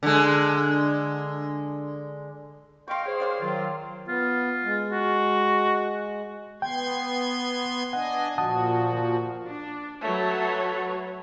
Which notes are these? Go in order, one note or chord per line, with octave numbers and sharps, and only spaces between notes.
D3 G#3
D#5 F5 G5 C6 C#6
G#4 C5 C#5
D5 F5 C6
D#3 F#3 F4
B3 F4
G#3
F#4
B3 G5 C6 G#6
D4 D#5 F#5 G#5
A#2 F3 F#4 F#5 A5 D#6
D4
F#3 A3 B4 C#5